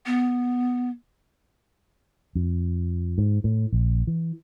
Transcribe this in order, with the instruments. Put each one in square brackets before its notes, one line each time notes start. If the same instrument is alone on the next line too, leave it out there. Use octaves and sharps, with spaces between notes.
[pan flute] B3
[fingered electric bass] F2
G#2
A2
A#1
E3